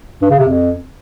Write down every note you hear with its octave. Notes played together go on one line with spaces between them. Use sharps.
G2
C#3
C3
F2